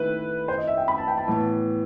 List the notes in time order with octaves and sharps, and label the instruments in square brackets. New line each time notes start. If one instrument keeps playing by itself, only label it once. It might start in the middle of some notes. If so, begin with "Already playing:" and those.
Already playing: [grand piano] D#3 A3 E4 [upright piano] B4
[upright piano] C5
D#5
E5
G5
B5
A5
G5
A5
[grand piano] A2 E3 B3